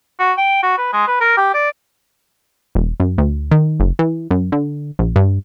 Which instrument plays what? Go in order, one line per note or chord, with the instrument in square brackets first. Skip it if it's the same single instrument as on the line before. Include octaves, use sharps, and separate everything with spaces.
[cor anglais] F#4
G5
F#4
B4
G#3
B4
A#4
G4
D5
[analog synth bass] E1
F#2
D2
D#3
F#1
E3
F#2
D3
A#1
G2